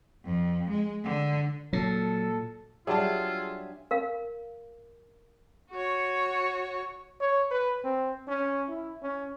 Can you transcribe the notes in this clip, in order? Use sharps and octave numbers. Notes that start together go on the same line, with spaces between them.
F2
G#3
D3
A#2 F#3 A4
F#3 G3 D4 F4 G#4 E5 G#5 A5
A#4 F5
F#4 C#5
C#5
B4
C4
C#4
E4
C#4